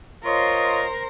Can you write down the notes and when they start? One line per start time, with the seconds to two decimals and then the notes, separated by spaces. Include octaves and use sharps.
0.25 F4 A#4 C5 C#5 D#5